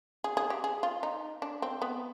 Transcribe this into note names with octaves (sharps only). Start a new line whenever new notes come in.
G#4
G#4
G4
G#4
F4
D#4
D4
C4
B3